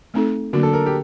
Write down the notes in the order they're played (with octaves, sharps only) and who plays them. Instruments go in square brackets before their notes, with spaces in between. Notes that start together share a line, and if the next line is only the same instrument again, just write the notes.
[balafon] A3 C4 D#4 A4
[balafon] D3 F#3 A#3 F#4 [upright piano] D4
[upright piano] A4
A#4
G4